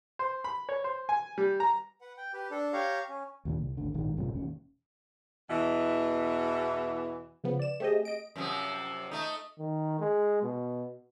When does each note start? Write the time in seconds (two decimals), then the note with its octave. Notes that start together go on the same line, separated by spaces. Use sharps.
0.19 C5
0.44 B5
0.69 C#5
0.84 C5
1.09 G#5
1.38 G3
1.60 A#5
2.01 B4 F#5
2.18 G5
2.33 G4 B4
2.51 D4 A4
2.73 G4 C#5 F5 A#5
3.09 C#4
3.45 D#2 A#2 D3
3.58 C2
3.77 G#1 D2 D3
3.94 A#1 G#2 D#3
4.17 A#1 G2 C3 F3
4.35 E1 A1 D#2 C#4
5.49 E2 B2 E3
7.44 C#3 F3 B3
7.59 D5 E7
7.80 A3 C4 G4 G#4 D#5
8.05 D#5 D7
8.36 F#2 C3 F3
9.12 A3 D#4
9.59 D#3
10.00 G#3
10.43 B2